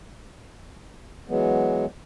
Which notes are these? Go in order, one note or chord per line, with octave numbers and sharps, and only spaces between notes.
E3 F#3 G#3 B3